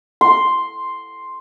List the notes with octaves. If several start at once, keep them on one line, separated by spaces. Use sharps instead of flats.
C6